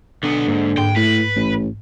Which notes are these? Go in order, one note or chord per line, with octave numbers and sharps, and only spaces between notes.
B1 D3 B3
G#2 A#3
G#2 G5
A2 B4
A1